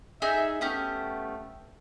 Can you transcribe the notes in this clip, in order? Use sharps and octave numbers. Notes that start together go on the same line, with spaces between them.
D#4 G#4 E5
A3 B3 C#4 G4